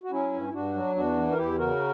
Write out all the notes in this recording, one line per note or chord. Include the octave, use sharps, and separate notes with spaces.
F#4
F#3 C#4 E4
G2
E4
G2 D4 F#4
F#3
E2 D4 F#4
E3
A#4
E2 E4 G4
C#3 F#4 A#4